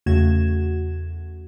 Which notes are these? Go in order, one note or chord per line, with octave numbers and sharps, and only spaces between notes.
E2 C#3 A3 F#4 G#6 E7